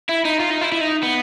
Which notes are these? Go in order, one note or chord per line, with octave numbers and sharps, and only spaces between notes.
E4
D#4
F4
D#4
E4
E4
D#4
B3